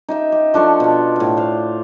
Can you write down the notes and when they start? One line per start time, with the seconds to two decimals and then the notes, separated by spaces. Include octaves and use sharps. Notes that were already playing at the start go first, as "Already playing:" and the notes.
0.09 D#4 G4 E5
0.32 G4
0.54 F3 D4 A4 C#6
0.80 B2 F4
1.16 A2 F5
1.37 C5 F5